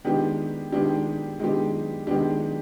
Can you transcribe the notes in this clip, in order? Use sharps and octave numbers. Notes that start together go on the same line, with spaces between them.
D#3 G#3 B3 D4 G4
D#3 G#3 B3 D4 G4
D#3 G#3 B3 D4 G4
D#3 G#3 B3 D4 G4